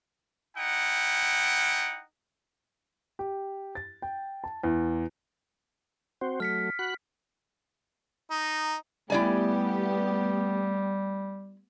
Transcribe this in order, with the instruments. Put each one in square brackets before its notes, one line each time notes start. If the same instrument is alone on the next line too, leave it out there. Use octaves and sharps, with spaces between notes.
[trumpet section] D#4 E4 F#5 G5
[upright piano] G4
A6
G5
A5
E2
[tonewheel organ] C4 F#4 C5
[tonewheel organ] F#3 A3 [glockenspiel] F6 B6 C#7
[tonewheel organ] F#4 B5 F#6
[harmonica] D#4
[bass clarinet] G3 [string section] A3 B3 G4 [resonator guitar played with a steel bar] E4 D5 G#5